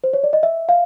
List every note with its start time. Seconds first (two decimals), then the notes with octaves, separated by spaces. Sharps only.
0.04 C5
0.13 C#5
0.24 D5
0.33 D#5
0.43 E5
0.69 F5